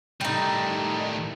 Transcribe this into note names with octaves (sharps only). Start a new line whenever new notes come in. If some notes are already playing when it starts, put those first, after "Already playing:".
A2 D#3 G3 D#4